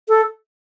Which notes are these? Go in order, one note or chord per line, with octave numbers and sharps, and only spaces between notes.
A4